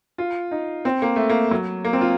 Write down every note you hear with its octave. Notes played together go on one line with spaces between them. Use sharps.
F4
D#4
C4
A#3
A3
A#3
F#3
A#3
C4
F4